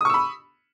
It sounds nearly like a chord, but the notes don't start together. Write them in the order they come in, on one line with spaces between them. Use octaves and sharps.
D#6 C#6 E6 B5